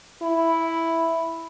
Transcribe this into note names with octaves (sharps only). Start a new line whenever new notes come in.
E4